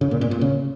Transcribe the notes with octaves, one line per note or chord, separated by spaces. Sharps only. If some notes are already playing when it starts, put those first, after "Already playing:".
C#3
A#2
A#2
A#2
C#3